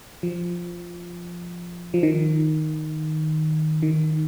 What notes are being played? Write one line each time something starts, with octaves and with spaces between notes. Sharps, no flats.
F3
F3
D#3
D#3